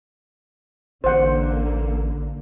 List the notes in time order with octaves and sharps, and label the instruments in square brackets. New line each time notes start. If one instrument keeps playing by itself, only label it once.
[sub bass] A1 [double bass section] D3 A#3 [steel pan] C5 F#5